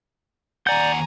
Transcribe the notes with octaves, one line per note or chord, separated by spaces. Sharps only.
D#2 D5 F#5 G#5 A#5 G6